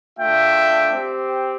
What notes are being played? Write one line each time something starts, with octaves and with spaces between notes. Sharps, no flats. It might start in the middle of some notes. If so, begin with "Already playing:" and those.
A3 D4 F4 E5 G5
C4 G4